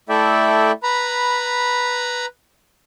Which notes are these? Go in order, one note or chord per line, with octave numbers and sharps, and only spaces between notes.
A3 E4 A4 D5 E5 G5
B4 A#5 B5